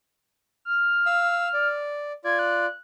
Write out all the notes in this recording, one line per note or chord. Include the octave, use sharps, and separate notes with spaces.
F6
F5 E6
D5
F4 D5 G#6
F#6